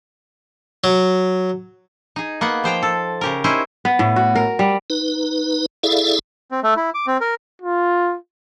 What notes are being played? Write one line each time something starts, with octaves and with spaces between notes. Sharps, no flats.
F#3
D#4 G#4
A#3 B3 F#5
F3 C5 G5 A#5
A4
C#3 G4 A#4
C#4 D#4 E4 C5
B3
A2
F#4
A#4
G3
D#4 B4
E4 G#4 A4 D5 E5 F5
C4
A3
E4
D6
C4
A#4
F4